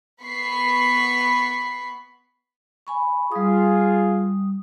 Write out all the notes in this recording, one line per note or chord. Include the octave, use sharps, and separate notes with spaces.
B3 B5 C#6 B6 C7
G#5 B5 C#6
G3 F4 G#4 D#6